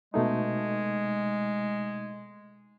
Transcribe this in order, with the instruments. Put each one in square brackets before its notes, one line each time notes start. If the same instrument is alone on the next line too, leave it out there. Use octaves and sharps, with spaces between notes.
[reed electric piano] B2 A3 D#4 [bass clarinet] G#3